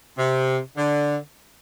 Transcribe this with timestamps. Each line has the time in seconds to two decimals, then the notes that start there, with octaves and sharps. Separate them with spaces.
0.18 C3
0.76 D3